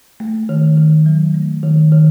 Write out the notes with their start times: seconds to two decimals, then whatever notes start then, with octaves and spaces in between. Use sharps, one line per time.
0.20 A3
0.49 D#3
0.77 D#3
1.06 F#3
1.34 A3
1.63 D#3
1.92 D#3